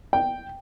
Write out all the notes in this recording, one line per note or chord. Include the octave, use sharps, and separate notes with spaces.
G5